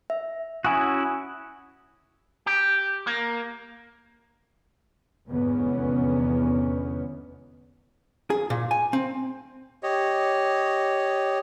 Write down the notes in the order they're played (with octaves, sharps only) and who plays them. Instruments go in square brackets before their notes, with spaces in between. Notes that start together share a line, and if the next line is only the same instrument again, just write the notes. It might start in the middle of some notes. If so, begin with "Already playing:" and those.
[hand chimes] E5
[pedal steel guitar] C#4 E4 F#4 [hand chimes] G#5 D#6
[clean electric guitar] G4
A#3
[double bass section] F1 E2 G#2 D3 B3 C#4
[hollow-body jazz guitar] G#4
A#2
G#5
C4
[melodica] G4 C#5 D#5